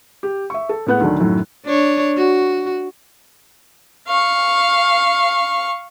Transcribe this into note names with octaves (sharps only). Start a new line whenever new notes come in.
G4
E5 C#6
A4
A2 G#3 B3 F#5 F#6
D2 D#3 F#3 A3 D4
F#2 A2 D#3 F#3
D4 C#5
F#4
F5 C#6